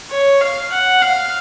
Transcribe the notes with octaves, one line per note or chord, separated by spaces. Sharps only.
C#5
F5
F#5
F5